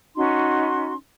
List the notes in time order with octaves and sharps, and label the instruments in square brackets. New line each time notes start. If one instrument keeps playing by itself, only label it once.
[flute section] C#4 D#4 F#4 C6